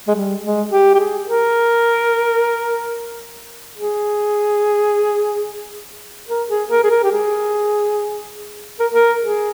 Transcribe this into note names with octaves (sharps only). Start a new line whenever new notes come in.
G#3
G3
G#3
G4
G4
G#4
A#4
G#4
A#4
G#4
A#4
G#4
A#4
G4
G#4
A#4
A#4
G#4